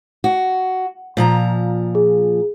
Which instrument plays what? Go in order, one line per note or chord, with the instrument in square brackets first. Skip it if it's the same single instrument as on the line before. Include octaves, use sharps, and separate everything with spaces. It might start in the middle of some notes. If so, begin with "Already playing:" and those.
[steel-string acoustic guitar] F#4
A#2 F3 A#5
[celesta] G#4